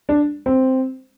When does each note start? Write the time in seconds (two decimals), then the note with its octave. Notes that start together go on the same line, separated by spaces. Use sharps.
0.09 D4
0.46 C4